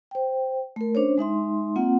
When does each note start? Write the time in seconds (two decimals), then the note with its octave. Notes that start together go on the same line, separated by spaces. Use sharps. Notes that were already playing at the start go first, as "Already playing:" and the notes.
0.11 C5 G5
0.76 A3 A#4
0.95 C#4 D4 C5 C#5
1.18 G#3 D#4 E5 C6
1.76 A#3 C4 F4 F#5